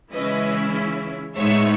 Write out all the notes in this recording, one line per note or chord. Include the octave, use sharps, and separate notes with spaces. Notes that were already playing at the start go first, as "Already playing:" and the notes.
C#3 E3 G#3 C#4 E4 B4 D#5
A2 G#3 B3 D#4 C#5 E5